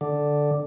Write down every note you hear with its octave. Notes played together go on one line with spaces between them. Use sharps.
D3